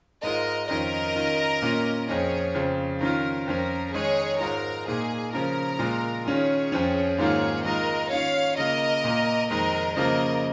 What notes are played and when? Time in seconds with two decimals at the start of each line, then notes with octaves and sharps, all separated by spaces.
0.23 G#2 G#3 F4 A#4 D#5
0.69 F2 D#3 C#4 F4 A#4 D#5
1.16 D#3 C#4 F4
1.62 A#2 A#3 C#4 F4
2.08 F2 F3 C#4 G#4 C#5
2.55 F2 C#3 F3
3.01 D#3 C#4 F4 A#4
3.47 F2 F3 C#4 A#4
3.94 D#3 G#3 D#4 G#4 C#5
4.40 G#2 G#3 F4 A#4
4.86 A#2 A#3 D#4 G#4
5.33 C#3 F3 C#4 F4 A#4
5.79 A#2 G#3 F4
6.26 D#3 C#4 F4 G#4 C#5
6.72 F2 F3 C#4
7.18 G#2 D#3 A#3 F4 G#4 C#5
7.64 D#3 G#3 F4 A#4 D#5
8.10 D#3 C#4 F4 C#5 F5
8.57 C#3 A#3 F4 A#4 D#5
9.04 A#2 A#3 F4
9.50 F2 D#3 G#3 A#4 D#5
9.96 C#3 F3 A#3 F4 A#4 D#5